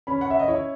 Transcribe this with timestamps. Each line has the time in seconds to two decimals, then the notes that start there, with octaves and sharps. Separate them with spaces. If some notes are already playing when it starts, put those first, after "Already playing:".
0.07 C#4 B5
0.21 F#5
0.30 E5
0.39 D#5
0.48 E4 C#5